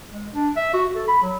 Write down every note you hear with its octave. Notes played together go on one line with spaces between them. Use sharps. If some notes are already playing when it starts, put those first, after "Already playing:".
G#3
D4
E5
F#4
A4
B5
F#3